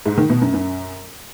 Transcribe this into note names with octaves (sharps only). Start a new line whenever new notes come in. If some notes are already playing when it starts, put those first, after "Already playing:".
G#2
D#3
B2
F#2
F#2